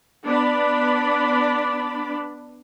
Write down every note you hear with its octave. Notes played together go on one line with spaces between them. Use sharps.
B3 D4 D5 B5